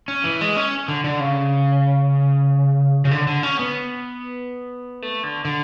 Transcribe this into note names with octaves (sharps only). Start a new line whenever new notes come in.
C#4
E3
G#3
C#4
D3
D3
C#3
C#3
D3
D3
C#4
B3
A3
D3
D3